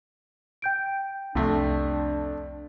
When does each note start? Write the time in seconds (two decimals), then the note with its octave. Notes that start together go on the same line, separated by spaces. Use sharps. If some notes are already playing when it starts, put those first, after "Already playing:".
0.62 G5 G6 D7
1.35 C2 F2 C3 A3 D4